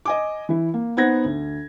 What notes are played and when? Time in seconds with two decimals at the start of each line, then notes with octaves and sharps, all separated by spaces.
0.05 D#5 G#5 D6
0.49 E3 E4
0.74 A#3
0.97 B3 D#4 C5 F#5 G#6 A#6
1.24 D2